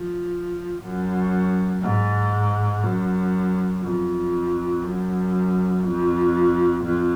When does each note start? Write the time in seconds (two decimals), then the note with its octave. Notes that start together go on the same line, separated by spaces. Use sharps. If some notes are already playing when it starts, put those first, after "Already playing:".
Already playing: F3
0.82 F#2
1.82 G#2
2.83 F#2
3.82 F2
4.83 F#2
5.83 F2
6.84 F2